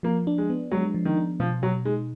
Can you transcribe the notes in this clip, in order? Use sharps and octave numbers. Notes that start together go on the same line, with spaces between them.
F3 A#3
D4
G#3
B3
F#3 G#3
F3
D#3
D4
B2 F3
B2 F#3
G#3 D#4